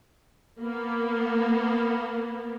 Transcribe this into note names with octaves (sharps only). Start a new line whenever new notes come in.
A#3 B3